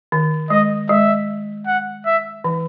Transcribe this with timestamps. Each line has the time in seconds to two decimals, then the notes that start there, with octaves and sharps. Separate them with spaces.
0.12 D#3
0.50 G#3 D#5
0.89 G#3 E5
1.67 F#5
2.06 E5
2.44 E3